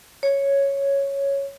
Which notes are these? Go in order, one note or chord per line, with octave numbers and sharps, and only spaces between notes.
C#5